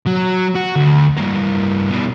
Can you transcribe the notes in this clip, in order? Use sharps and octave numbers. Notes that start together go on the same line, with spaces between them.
F#3
F#4
D2
G2 A#3
B2 G3